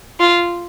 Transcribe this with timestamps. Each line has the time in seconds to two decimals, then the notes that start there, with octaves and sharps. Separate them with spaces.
0.20 F4